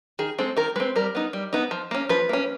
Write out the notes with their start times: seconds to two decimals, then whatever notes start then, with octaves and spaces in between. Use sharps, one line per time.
0.19 D#3 G#4
0.38 G#3 C4 A4
0.57 D#3 A#4
0.76 G#3 C4 B4
0.96 G3 A#4
1.15 B3 D#4
1.33 G3
1.53 B3 D#4
1.71 F3
1.91 A#3 C#4
2.09 F3 B4
2.29 A#3 C#4